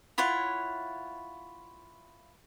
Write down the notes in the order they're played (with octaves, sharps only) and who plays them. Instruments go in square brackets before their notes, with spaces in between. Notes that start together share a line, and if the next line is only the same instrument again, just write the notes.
[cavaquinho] E4 F4 C#5 F#5